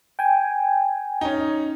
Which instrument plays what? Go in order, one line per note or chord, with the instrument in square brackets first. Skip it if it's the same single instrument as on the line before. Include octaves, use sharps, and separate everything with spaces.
[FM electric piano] G5 G#5
[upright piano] C#4 D#4